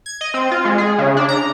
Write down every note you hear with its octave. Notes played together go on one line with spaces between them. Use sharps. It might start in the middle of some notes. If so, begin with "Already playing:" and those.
G#6
D#5
C4
F4
G#3
G#4
C#3
D4
A#5